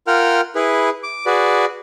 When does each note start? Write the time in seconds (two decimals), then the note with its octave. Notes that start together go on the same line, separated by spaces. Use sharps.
0.07 F4 A#4 F#5 G5 F6
0.55 E4 G#4 B4
1.03 D6
1.26 F#4 G#4 B4 D5